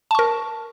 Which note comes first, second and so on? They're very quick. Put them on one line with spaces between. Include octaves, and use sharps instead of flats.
A5 C#6 A#4